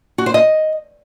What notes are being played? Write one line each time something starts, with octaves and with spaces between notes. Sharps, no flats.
F#4
C5
D#5